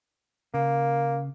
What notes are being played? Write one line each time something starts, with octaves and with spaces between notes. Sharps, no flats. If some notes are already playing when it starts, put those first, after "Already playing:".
C#3 A#3